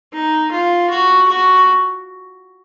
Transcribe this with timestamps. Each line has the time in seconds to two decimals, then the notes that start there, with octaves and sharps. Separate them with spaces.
0.13 D#4
0.51 F4
0.90 F#4
1.29 F#4